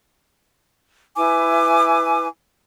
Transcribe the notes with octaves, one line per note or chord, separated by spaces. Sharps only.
E4 B4 G#5 D6